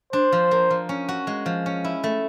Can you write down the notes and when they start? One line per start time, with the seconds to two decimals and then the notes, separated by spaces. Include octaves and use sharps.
0.13 D4 C5
0.32 F3
0.51 A#3
0.71 F3
0.89 C#4
1.09 F#4
1.27 G#3
1.46 F3
1.66 C#4
1.84 E4
2.04 A3